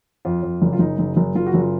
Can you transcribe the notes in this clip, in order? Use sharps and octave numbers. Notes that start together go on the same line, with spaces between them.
F2 F4
F2
F#1
F4
F#1 D#4
F#1
F#1
F#1 F4
F#4
F#1 F4